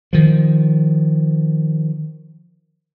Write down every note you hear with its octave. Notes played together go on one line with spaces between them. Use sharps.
D#3 F3